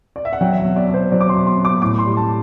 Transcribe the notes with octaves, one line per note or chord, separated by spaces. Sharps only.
D5
E5
F#5
F#3 G5
E5
F#5
B2
D5
B2
C5
F#3 D5
D6
C6
B2
C6
B2
D6
A2 D6
C6
G3
A5